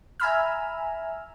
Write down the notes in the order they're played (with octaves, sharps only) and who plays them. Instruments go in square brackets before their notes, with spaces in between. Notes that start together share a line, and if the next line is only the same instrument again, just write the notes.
[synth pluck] E5 G#5 A#5 B5 E6 F6